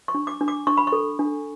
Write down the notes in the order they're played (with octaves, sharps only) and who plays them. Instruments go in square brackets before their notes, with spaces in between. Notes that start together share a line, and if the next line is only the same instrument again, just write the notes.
[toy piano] C#6
D4
D6
D4
D6
D4 C#6
B5
C#6
A4
D4